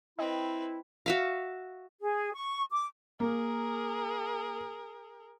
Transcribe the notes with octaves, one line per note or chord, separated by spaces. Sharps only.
C4 E4 B4 D#5 G5
F#4 E5 F5
G#4
C#6
D6
A#3 G#4 A#4